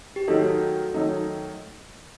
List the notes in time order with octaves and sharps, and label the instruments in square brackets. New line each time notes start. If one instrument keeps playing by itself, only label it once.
[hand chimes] G4
[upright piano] D#3 F#3 A3 D#4 [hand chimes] F#4 A4
[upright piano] D#3 F#3 A3 D#4